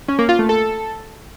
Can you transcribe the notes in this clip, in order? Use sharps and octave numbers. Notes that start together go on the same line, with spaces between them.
C#4
A#3
F4
A3
A4